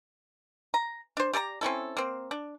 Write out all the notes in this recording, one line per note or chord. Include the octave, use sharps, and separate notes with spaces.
A#5
D4 C5
G4 D5 A5 A#5
C4 C#4 E4 A4
A#3 C4
D4